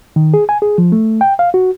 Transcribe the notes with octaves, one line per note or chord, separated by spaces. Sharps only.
D#3
G#4
G#5
G#4
F3
A3
G5
F5
F#4